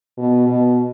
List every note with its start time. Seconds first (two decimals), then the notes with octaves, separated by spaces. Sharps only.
0.18 B2
0.48 B2